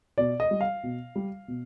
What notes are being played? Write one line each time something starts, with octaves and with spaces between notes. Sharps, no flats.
B2 D5
D#5
G3
F5
B2
G3
B2